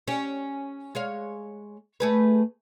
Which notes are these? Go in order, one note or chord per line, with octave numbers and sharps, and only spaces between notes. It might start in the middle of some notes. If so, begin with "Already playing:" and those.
C#4 G4
G#3 C#5 F5
A3 G#4 B4